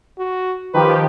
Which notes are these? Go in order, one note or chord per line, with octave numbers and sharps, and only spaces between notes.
F#4
D#3 F3 G4 B4